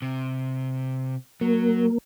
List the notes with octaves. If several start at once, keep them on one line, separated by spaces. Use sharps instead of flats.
C3
F#3 A#3